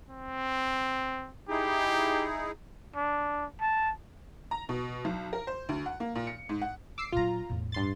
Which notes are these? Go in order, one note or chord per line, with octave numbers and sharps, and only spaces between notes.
C4
D#4 E4 G4 G#4
D4
A5
A#5
B2
B1
A#4
C5
D2
F#5
A#3
A#2
C#7
G#2
F#5
D6 E6 C7
A#2 F#3 F4 A#5
E2 A2
G2 C6 A6